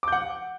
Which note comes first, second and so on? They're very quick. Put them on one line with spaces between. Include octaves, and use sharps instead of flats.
D6 G6 F#5